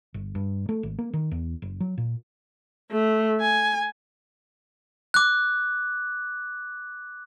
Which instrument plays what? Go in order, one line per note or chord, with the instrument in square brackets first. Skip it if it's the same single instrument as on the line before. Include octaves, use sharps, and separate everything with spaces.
[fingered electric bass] G1
G2
A3
G#1
A#3
D#3
E2
F#1
F#3
A#2
[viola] A3
G#5
[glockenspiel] D6 F#6